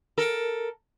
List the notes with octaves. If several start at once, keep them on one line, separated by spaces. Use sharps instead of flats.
A4 A#4